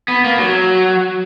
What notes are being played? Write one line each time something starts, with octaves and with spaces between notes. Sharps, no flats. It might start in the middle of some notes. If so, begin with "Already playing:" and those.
B3
A#3
F#3